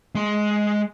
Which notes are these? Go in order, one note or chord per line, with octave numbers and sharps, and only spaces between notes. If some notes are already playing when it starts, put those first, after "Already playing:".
G#3 C6